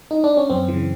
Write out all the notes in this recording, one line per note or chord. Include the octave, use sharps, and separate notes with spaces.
D#4
D4
C#4
F#2 C4
C#3 E3